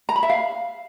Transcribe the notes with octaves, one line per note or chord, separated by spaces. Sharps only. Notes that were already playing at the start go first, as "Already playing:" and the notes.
A#5
B5
E5
F5